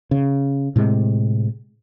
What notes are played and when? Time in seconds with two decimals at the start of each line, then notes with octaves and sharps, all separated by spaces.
0.11 C#3
0.76 A2 C3 G#3